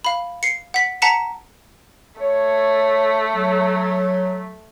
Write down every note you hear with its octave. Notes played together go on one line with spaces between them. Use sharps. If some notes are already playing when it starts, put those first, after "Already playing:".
F5 B5
C7 C#7
F#5 B6
F#5 A5 A#5 B6 C#7 E7
A3 C#5
F#3